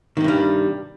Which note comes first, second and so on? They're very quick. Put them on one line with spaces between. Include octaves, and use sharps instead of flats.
D#3 C3 G2 G3